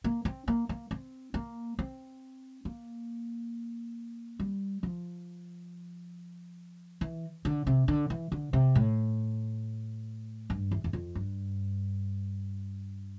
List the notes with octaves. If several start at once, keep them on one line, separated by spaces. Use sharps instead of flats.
A#3
C4
A#3
A#3
C4
A#3
C4
A#3
G3
F3
E3
D3
C3
D3
E3
D3
C3
A2
G2
E2
E2
F2
G2